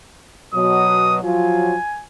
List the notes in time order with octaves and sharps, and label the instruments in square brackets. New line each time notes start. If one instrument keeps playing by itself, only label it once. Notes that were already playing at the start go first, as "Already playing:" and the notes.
[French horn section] B2 F#3 [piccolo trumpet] D#6
[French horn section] F3 F#3 F4 [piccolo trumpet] G#5